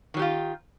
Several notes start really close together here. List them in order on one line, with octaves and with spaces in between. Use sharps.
D#3 F#3 G4 F4